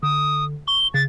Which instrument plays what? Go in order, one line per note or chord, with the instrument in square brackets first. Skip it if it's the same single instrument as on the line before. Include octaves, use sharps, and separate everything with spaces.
[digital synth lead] D3 [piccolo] D#6
[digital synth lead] C#6 [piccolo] G7
[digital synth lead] C#3 [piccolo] A6